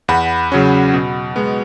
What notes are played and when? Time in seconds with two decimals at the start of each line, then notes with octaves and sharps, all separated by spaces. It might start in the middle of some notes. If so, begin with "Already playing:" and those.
0.08 E2 F#5 B5
0.52 C#3 F#3 C#4
0.94 B2
1.36 G#3 B3